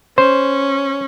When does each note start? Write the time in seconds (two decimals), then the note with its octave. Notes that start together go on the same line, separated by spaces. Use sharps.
0.18 C#4 C5